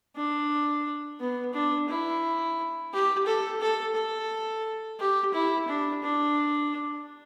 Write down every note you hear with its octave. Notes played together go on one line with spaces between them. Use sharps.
D4
B3
D4
E4
G4
A4
A4
A4
G4
E4
D4
D4